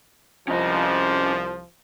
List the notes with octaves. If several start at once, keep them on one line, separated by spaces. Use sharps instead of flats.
C2 F3 C#4 D#5